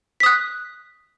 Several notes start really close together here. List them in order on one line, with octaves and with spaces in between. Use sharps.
B6 D#6 F#6